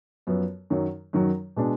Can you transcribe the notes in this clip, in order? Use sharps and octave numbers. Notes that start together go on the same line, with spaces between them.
F#2 F3 B3
F#2 D#3 F#3
F#2 D#3 F#3
B2 G#3 D4